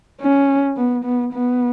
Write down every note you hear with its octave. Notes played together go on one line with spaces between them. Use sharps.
C#4
B3
B3
B3